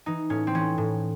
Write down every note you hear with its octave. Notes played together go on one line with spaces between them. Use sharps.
E3 D#4
A2 C#4
C4
E3 C#4
A2